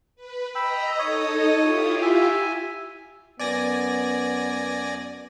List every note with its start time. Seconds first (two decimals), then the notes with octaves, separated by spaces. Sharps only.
0.16 B4
0.55 D#5 G5 A#5 B5 E6
0.99 D#4 A4 C#5 D#5 D#6
1.59 E4 F4 G4
2.02 E5 G#5
3.40 F#2 B3 D5 G#5 A#6